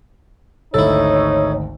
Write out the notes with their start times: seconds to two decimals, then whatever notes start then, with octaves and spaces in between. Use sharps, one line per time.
0.74 G#1 D2 D#4 E4 A4 C#5